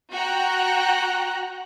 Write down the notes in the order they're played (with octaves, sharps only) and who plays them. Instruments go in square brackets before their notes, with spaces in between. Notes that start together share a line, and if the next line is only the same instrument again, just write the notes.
[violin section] F#4 G5 A#5 F#6